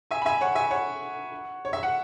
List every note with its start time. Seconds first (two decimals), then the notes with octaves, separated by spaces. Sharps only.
0.11 E5 G#5
0.22 B5
0.25 E5 G#5
0.41 C#5 F#5
0.55 E5 G#5
0.71 C#5 F#5
1.65 C#5
1.73 E5
1.83 F#5